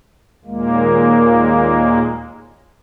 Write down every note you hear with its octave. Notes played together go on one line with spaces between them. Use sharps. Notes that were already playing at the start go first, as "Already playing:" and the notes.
D#2 A#2 G#3 A#3